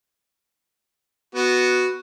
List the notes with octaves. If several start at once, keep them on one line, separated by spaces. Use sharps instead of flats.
B3 F#4